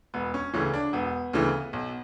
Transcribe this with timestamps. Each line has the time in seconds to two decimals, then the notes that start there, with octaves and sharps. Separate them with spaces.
0.14 E1 B3
0.34 C#4
0.54 D2 C#3 E3 C#4
0.74 D4
0.93 E1 B3
1.33 D2 C#3 E3
1.73 B1